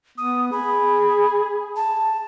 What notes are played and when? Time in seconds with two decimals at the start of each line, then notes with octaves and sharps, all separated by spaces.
0.18 B3 D#6
0.52 G#4 B5
1.76 A5